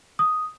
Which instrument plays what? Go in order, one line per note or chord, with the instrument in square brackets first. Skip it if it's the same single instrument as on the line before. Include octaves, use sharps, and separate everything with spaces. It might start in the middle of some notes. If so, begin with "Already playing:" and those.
[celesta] D#6